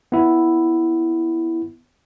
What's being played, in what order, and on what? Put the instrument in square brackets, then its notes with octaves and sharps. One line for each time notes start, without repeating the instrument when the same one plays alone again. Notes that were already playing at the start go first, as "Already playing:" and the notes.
[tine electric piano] B3 E4